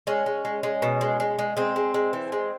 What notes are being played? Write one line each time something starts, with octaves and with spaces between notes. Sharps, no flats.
G#3 C#4
G#3
G#3
G#3
B2
G#3
G#3
G#3
G#3 C4
G#3
G#3
E3
G#3